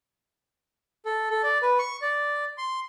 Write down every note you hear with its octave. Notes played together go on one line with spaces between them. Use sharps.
A4
A4
D5
B4
C#6
D5
C6